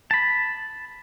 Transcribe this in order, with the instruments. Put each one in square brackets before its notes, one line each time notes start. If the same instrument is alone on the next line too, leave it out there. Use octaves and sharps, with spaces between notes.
[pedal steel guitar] A5 B5